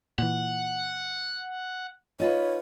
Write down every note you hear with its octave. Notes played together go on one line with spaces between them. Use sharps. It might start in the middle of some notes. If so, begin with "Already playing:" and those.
A#2 E3 F#5
D#4 F4 B4 C#5